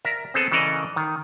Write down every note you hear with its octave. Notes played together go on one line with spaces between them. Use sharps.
A#4 D5 E5
B3 C4 G#4 A4
C#3 E3 A4 A#4 D5 D#5
D#3